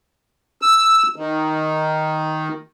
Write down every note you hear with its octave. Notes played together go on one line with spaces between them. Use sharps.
E6
D#3